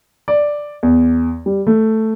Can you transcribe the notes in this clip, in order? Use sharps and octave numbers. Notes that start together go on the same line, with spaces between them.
D5
E2
G3
A3